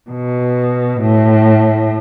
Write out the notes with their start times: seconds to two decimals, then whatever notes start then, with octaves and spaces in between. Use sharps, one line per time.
0.11 B2
1.01 A2